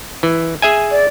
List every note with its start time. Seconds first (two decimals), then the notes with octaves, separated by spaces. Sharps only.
0.23 E3
0.62 G#4 E5 G#5
0.91 D5